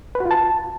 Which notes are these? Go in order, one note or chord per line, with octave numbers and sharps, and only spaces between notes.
B4
F#4
F4
A5